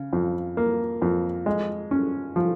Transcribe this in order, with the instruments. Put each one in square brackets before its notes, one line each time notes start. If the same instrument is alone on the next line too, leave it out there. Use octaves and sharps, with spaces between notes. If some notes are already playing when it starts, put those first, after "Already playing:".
Already playing: [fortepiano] C#3
F2
A#3
F2
G#3
C#4
F3